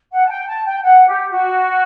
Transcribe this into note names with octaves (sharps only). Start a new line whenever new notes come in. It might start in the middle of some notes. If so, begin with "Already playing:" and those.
F#5
A5
G5
A5
G5
F#5
G4
F#4